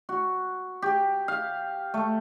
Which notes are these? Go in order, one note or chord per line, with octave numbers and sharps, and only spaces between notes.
F#4
G4
F5
A3